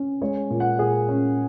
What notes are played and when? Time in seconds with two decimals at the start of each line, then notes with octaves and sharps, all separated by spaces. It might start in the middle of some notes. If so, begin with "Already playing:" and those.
Already playing: C#4
0.22 G#3 C#5
0.50 A#2
0.60 F#5
0.79 A#2 G#4
1.08 C#4